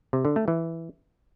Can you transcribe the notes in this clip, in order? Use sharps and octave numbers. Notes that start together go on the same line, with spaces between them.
C3
D3
A3
E3